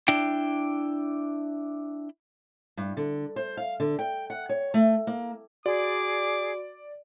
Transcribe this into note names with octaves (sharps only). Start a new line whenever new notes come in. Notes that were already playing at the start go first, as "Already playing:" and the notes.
D4 E4 G5
G2
D3
C5
F5
D3
G5
F#5
C#5
A3
A#3
F#4 G#4 D5 D6